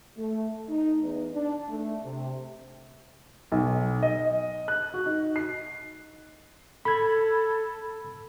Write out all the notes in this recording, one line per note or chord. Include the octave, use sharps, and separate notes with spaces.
A3
D#4
E2
D4
A3
C3
B1
D#5
F#6
F#4
D#4
C7
A4 B5 G#6